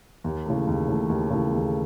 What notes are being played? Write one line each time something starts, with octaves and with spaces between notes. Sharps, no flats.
D#2
C#3 E3 A3
D#2
C#3 E3 A3
D#2
C#3 E3 A3
D#2